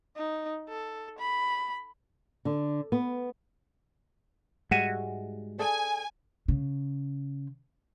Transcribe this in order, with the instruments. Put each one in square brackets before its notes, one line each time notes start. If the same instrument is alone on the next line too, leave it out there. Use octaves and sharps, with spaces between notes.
[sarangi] D#4
A4
B5
[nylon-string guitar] D3
B3
[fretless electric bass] G#2 G3 G#3 [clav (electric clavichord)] F#4 E5 G#5 [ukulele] F#5
[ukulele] G#4 A4 D5 [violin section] G#5
[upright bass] C#3